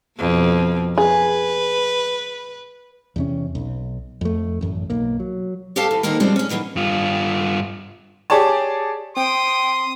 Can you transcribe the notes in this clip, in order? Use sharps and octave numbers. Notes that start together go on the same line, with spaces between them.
F2 B2
G#4 B4
E2 C3 C#4
B1
F2 A3
A1 F#2
B1 A#3
F#3
G4 A4 C5 C#5 F5 A5
E3
D2 D3 D#3 A#3 A#4
C#3 F3 G3 G#3 C4 D4
C#4 G#4
D#3 E3 F#3 A3 A#3
G2 F4
G4 G#4 C#5 D5 A5
C4 G5 C6 D#6